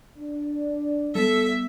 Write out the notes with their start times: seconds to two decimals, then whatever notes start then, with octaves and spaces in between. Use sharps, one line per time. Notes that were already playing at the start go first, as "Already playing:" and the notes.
0.17 D4
1.15 G3 A#3 B3 A4 E5